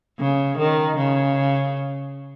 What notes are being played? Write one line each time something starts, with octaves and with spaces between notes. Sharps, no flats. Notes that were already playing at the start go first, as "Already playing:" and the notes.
C#3
D#3
C#3